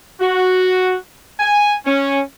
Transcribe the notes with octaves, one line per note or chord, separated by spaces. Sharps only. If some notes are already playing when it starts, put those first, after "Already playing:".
F#4
G#5
C#4